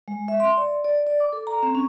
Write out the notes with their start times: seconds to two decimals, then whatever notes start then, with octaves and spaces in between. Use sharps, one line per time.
0.08 G#3
0.28 E5
0.40 C6
0.57 D5
0.85 D5
1.07 D5
1.20 D6
1.33 A4
1.47 A#5
1.63 C4
1.75 C#4